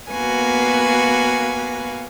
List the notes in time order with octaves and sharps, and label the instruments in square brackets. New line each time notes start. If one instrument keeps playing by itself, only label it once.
[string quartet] A#3 B3 F#4 B4 F5 G#5